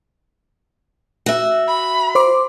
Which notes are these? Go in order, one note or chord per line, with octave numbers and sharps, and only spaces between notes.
F#4 E5
B5
C5 C6 D6